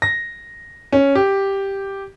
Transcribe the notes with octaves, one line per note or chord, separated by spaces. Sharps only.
A#6
C#4
G4